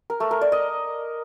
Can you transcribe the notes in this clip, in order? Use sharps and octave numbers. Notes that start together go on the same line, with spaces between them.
A#4
A3
A#4
D5
D#5